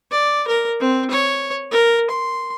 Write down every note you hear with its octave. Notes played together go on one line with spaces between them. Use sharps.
D5
A#4
C4
C#5
A#4
C6